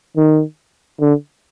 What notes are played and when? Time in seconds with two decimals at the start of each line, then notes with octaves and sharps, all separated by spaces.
0.17 D#3
1.00 D3